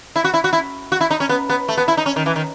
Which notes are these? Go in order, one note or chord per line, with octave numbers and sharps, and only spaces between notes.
E4
F#4
E4
F#4
E4
F#4
E4
D#4
C#4
B3
B3
A3
B3
E4
D#4
C#4
D#3
E3
D#3